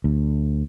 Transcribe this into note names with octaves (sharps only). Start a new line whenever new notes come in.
D2